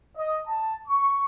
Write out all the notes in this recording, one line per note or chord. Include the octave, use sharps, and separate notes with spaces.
D#5
A5
C#6